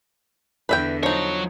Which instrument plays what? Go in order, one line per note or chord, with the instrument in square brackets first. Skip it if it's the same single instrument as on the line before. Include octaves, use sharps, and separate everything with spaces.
[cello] E2 D3 [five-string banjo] B4 E5 G5
[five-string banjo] F3 D#4 [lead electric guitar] F#3 C#5